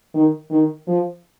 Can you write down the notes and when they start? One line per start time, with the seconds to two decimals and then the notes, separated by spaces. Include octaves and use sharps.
0.14 D#3
0.51 D#3
0.87 F3